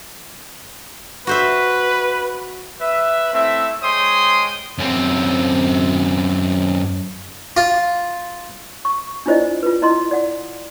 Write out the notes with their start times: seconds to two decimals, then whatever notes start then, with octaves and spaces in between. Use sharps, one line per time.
1.27 F#4 B4 C5 E5
2.80 B4 E5
3.34 A3 C4 E4 E5
3.82 G#3 C5 C#5 G5 C6 D#6
4.78 F#2 C4
7.57 F4
8.85 C#6
9.26 D4 E4 F4 C5 D5 D#5
9.63 F4 B4
9.82 E4 D#5 A#5 C6
10.11 D5 F#5